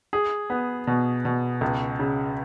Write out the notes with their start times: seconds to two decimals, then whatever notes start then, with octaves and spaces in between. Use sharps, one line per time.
0.13 G#4
0.50 B3
0.87 B2
1.25 B2
1.61 C#2
1.99 C#3